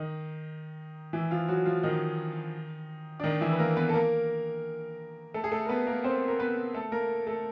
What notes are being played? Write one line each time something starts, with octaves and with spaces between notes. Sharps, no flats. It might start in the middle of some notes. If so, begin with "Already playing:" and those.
Already playing: D#3 D#4
E3 E4
F3 F4
F#3 F#4
F3 F4
D#3 D#4
D4
D#3 D#4
E3 E4
B4
A#3 A#4
B3 B4
A4
A#3 A#4
A3 A4
G#4
A3 A4
A#4
B3 B4
A#3 A#4
C4 C5
A#4
B3 B4
A3 A4
A#3 A#4
A3 A4